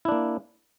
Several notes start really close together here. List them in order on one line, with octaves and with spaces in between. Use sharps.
E4 D4 A#3